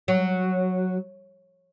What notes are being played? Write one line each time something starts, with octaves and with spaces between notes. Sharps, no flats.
F#3